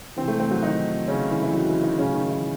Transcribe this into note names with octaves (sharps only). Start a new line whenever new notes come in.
C3 E3 C4
A3
C4
F#3 F#4
D#3 D#4
C#3 C#4
E3 E4
E3 E4
F#3 F#4
E3 E4
D#3 D#4
A2 C#3 F#3 C#4
D#3 D#4
E3 E4